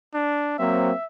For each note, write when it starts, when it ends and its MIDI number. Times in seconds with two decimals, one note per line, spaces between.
0.14 0.58 62
0.59 0.91 54
0.59 0.91 58
0.59 0.91 60
0.59 1.05 76